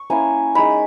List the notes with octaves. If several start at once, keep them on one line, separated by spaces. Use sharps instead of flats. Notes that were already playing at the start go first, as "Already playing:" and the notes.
Already playing: C#6
A#3 C#4 E4 G#5
G#3 D#4 B5